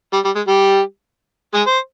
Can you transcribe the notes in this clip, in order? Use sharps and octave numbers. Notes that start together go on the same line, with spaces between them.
G3
G3
G#3
G3 G4
G#3 G#4
C5